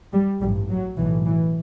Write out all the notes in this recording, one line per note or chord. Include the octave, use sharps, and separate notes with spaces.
G3
A1 G2 G3
F#3
B1 A2 E3
E3